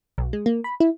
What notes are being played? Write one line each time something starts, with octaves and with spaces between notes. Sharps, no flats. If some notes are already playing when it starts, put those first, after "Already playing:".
B1
G#3
A#3
B5
E4